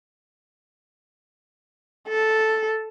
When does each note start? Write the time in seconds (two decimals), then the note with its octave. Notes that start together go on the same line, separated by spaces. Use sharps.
2.08 A4